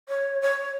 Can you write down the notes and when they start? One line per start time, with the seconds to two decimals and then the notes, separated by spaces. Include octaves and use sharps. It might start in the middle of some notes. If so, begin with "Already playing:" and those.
0.09 C#5
0.41 C#5